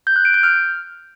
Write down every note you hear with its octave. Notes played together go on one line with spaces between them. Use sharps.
G6
F#6
D7
G6
F6